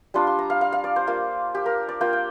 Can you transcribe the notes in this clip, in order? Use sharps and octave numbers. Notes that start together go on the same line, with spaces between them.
G3 D4 F4 C6
C6
A#5
F5
F5
F5
D5
C5
A#3 F4
G4
A#4
D5
A#3 F4 G5
G5